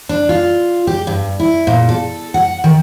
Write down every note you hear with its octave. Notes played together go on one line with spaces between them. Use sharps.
D4
F4
G4
G2
E4
A#2
A4
F#5
D#3